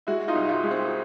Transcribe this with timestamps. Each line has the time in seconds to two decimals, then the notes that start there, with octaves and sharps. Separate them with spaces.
0.07 G#3 E4 F#4
0.28 D#4 F4
0.35 C2
0.49 D#4 F4
0.63 G#3
0.71 C4